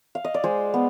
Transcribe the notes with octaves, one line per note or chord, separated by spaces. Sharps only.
F5
D#5
D5
G#3 G#4 C5
B3